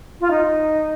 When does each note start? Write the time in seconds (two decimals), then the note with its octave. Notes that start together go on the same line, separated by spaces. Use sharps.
0.21 F4
0.31 D#4